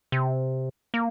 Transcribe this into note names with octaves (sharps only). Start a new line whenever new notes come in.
C3
A#3